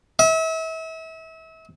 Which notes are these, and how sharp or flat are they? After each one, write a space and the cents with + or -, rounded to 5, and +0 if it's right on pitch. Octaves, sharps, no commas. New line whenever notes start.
E5 -35